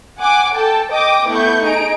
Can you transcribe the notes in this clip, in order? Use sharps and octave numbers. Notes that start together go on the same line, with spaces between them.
F#5 G#5 D6
A4 G5 A5
D#5 G5 D6 D#6
A3 B3 E4 C#6 G6
D#4 G#4 D7